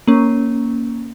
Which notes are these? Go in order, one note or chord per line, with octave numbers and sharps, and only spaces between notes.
A#3 C#4